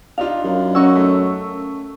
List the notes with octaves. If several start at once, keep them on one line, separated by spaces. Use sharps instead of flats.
D4 D#4 F4 F5
F#2
C#4 D#4 F#4 C#5 C#6 E6
A3